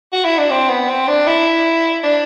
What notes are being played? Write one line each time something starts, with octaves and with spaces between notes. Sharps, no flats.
F#4
E4
D4
C4
B3
C4
D4
E4
D4